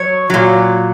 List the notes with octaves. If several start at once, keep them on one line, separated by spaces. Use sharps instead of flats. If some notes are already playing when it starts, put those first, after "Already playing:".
Already playing: F#3 C#5
A#2 F#3